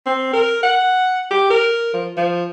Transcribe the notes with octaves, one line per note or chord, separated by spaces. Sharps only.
C4
A#4
F#5
G4
A#4
F3
F3